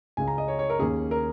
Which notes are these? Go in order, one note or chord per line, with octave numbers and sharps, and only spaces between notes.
C#2 C#3 G#3 C#4 G#5
A#5
D#5
C#5
C#5
A#4
D#2 D#3 A#3 C#4 G#4
A#4